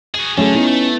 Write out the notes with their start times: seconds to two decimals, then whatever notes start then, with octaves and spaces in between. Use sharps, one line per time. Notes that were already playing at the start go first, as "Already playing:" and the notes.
0.14 F#4 G#4 D#7
0.38 D3 F#3 A3 C#4 G#4
0.55 D#3 B3 D#4 E4
0.67 A3